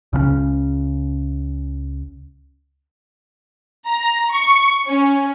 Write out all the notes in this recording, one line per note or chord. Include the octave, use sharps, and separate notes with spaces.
C#2 C#3 G3 C#4
A#5
C#6
C#4